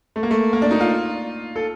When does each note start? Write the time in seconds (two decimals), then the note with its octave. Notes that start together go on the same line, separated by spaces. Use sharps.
0.16 A3
0.23 A#3
0.31 A3
0.53 A#3
0.62 D4
0.71 D#4
0.81 F4
1.56 A4